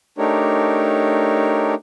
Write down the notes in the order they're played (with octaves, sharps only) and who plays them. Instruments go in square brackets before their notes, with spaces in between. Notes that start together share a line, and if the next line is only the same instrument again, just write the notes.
[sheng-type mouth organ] A3 D4 D#4 G4 A#4 C#5